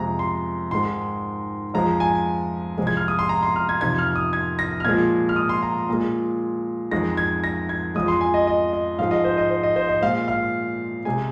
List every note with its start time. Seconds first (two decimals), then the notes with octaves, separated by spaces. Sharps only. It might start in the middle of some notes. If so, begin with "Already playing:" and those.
Already playing: F2 C3 G#3 A#5
0.19 C6
0.71 G#2 D#3 G#3 C6
1.74 F2 F3 G#3 A#5
2.00 G#5
2.78 F2 C3 F3 G#3
2.87 G#6
2.97 F6
3.08 D#6
3.19 C6
3.29 A#5
3.43 C6
3.56 F6
3.69 G#6
3.81 F2 C3 D#3 G#6
3.99 F6
4.16 D#6
4.33 G#6
4.59 A#6
4.80 F6
4.85 A#2 F3 G#3 G#6
5.29 F6
5.36 D#6
5.49 C6
5.63 A#5
5.89 A#2 G#3
6.91 F2 D#3 G#3 A#6
7.17 G#6
7.44 A#6
7.69 G#6
7.95 F2 F3 G#3 D#6
8.08 C6
8.21 G#5
8.34 D#5
8.47 D#5
8.73 D#5
8.99 G#2 F3 G#3 F5
9.11 D#5
9.25 C5
9.38 D#5
9.50 C5
9.63 D#5
9.76 C5
9.89 D#5
10.02 A#2 G#3 F5
10.28 F5
11.05 C3 G#3 G#5